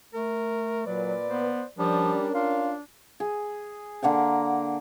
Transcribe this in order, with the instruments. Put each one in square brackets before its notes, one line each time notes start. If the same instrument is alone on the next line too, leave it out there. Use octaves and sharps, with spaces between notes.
[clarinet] A3 [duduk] A#4
[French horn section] A#2 B4 [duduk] F#3 [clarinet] D5
[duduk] B3 [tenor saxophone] C5
[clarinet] F3 [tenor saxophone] G3 [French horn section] C#4 A#4 [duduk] D4
[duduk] D4 [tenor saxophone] F4 [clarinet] F5
[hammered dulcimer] G#4
D3 A#3 F#5 G5